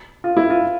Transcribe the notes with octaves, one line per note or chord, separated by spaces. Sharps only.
F4
E4
F4